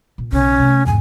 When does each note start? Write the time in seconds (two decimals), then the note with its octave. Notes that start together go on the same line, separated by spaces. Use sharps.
0.18 A#2
0.32 B1 C#3 C#4
0.60 C3 A3
0.86 E2 G#2 G#5